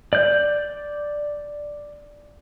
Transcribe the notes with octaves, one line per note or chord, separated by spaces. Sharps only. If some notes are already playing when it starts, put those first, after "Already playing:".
D5 G6